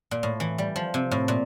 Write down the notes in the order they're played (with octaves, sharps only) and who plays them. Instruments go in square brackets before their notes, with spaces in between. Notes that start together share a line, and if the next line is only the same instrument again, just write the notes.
[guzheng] A#2
A2
E3
G3
F3
C3
A2
A#2